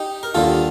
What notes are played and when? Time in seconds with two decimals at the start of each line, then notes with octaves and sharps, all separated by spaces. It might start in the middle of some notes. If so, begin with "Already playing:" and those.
Already playing: D#4 G4
0.23 A#4
0.34 D#2 D3 G3 F4 A4